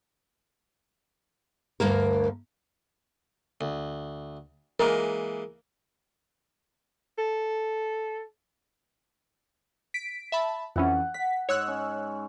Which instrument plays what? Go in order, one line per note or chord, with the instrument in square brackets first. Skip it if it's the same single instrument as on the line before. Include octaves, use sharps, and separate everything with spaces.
[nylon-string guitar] D2 G2 A#3 A#4
[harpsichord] D2
[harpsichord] E3 G#3 A#3 [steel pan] A#4
[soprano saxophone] A4
[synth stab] B6 D7
E5 A5 B5
[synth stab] F2 E3 C#4 [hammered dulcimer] F#5
[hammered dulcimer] F#5 [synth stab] B6
[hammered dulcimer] G#2 [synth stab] C#5 E6 F#6
[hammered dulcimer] C#4